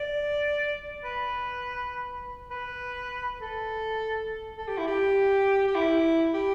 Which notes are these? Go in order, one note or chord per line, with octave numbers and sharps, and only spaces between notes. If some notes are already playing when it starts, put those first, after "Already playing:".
Already playing: D5
B4
B4
A4
A4
G4
E4
G4
G4
E4
G4